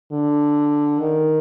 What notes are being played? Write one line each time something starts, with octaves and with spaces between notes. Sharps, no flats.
D3
D#3